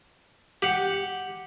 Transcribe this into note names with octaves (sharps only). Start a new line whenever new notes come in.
G4 F#5